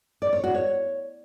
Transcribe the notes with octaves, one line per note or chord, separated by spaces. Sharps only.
D5
C#5
F#4
C#5